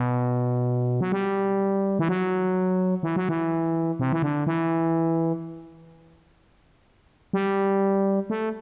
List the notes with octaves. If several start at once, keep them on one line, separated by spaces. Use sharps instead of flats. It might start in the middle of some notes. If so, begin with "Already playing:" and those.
Already playing: B2
F#3
G3
E3
F#3
E3
F#3
E3
C3
E3
D3
E3
G3
A3